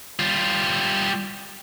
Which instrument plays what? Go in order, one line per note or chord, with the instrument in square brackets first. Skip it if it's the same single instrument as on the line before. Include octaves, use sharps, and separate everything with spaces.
[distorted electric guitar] G3 F4